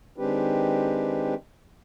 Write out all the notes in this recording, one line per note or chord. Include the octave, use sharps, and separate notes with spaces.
D#3 G#3 C4 D4 G4 B4